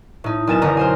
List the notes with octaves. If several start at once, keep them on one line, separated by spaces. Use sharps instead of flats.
A2 D#4
B1 A#4 G#5 A6 E7
E1 F#2 D3 D#4 D#5 A#5
A#4 C5 G#5